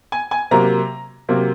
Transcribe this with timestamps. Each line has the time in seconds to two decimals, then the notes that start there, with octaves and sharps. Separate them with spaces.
0.12 G#5
0.31 G#5
0.51 C3 F#3 A#3 A#5
1.29 C3 F#3 A#3